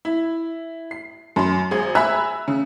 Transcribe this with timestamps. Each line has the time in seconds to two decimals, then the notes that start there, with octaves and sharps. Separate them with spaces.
0.05 E4
0.91 C7
1.36 F#2 C6
1.71 G#1 G#4
1.95 E5 G#5 A#5 B5 E6 F#6
2.48 C#3